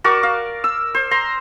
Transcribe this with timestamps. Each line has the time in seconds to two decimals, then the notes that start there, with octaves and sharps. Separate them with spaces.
0.04 F#4 A#4 D5 C#6
0.23 F5
0.64 E6
0.95 C5
1.11 A#5 C6